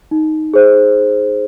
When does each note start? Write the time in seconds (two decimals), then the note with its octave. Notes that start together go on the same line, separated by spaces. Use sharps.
0.11 D#4
0.54 G#4 C5